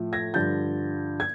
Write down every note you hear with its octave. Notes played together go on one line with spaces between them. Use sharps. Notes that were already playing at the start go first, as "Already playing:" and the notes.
Already playing: A2 F3
G#6 A#6
G2 D3 F3 G6 A6
G#6